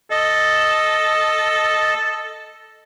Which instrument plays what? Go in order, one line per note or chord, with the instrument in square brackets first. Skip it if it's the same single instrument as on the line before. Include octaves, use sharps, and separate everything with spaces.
[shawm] A4 [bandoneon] D#5